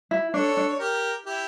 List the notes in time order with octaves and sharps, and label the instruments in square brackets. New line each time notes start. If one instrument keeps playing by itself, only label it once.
[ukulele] E4
[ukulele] D4 [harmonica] A4 C#5
[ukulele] D4
[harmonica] C#5
G4 A#4
E4 G4